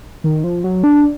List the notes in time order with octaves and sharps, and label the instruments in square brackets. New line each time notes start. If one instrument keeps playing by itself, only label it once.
[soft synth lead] D#3
F3
F#3
D4